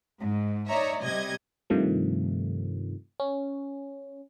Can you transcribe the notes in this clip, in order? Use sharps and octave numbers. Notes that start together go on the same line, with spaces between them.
G#2
D#4 C#5 D5 E5 A#5
C3 G3 D#5 G#6
G2 C3 D#3 F3 A3
C#4